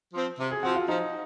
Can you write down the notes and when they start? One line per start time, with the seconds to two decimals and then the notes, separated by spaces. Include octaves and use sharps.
0.14 F3 C4
0.39 C3
0.52 G#4
0.63 F3 C4 F#4
0.76 F4
0.88 F3 D#4